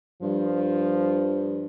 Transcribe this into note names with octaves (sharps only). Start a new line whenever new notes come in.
G2 F3